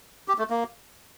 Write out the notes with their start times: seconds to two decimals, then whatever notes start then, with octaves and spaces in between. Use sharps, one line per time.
0.28 G4
0.38 A3
0.50 A#3